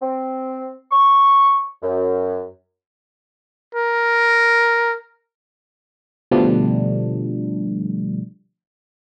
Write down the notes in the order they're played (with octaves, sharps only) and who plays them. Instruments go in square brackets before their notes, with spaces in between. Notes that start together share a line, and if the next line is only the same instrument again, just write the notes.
[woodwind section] C4
C#6
F#2
[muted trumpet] A#4
[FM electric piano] B2 D3 F3 G3 A3 D4